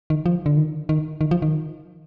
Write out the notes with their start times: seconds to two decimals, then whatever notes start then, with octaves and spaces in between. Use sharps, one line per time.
0.10 D#3
0.26 F3
0.46 D3
0.57 D#3
0.89 D#3
1.21 D#3
1.31 F3
1.42 D#3